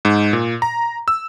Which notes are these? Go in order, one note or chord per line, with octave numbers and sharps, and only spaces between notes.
G#2
A#2
A#5
E6